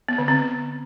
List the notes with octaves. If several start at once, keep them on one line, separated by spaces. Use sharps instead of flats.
B3
D3
C4